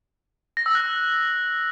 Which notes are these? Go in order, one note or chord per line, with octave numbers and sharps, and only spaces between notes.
A#6
E6
F#6